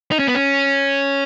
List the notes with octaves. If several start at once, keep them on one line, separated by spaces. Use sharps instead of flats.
D#4
C#4
B3
C#4